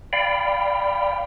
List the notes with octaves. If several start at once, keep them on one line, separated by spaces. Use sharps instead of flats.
D5 F5 G5 B5